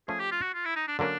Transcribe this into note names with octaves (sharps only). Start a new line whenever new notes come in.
F3 A3 C#4 G#4
G4
F4
F#4
F4
E4
D#4
D4
D3 F#3 A#3 C#4 D4